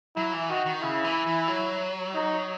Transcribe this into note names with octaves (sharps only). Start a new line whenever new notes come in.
F#3 E4
E3
D#3 F#4
D#3
C#3 E4
E3
E3
F#3
D#4